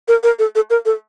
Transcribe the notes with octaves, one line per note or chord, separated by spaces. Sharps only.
A#4
A#4
A4
A4
A#4
A4